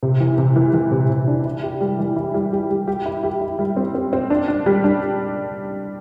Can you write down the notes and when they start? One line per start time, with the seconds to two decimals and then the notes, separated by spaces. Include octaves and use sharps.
0.03 C3
0.20 E3
0.38 C3
0.56 E3
0.74 E3
0.92 C3
1.10 C3
1.28 D4
1.45 E4
1.63 G4
1.81 G3
1.99 E3
2.16 E4
2.34 G3
2.53 G4
2.70 G3
2.88 G4
3.06 E4
3.23 G4
3.41 E4
3.59 G3
3.77 C4
3.94 C4
4.13 C4
4.30 D4
4.48 D4
4.66 G3
4.84 D4